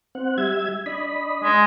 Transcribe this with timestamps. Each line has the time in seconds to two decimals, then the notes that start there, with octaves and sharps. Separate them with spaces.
0.15 C4 F#5
0.38 G3 E5 G#6
0.86 D4 D#5 B5
1.44 G#3